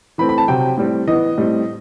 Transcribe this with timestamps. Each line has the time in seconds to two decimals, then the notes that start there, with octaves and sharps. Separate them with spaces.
0.18 E3 A3 C4 B5
0.29 B5
0.38 A5
0.48 C3 F#3 C4 G5
0.78 A2 G3 C4
1.07 E3 B3 D#5
1.38 A2 G3 C4